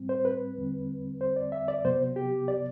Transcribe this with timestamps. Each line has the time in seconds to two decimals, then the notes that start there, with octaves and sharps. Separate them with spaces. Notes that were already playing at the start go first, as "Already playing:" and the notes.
Already playing: A2 G3 C4
0.09 C5
0.25 B4
0.57 E2 D3 G3 C4
1.21 C5
1.36 D5
1.52 E5
1.68 D5
1.84 C3 F#3 B3 C5
2.16 G4
2.48 D5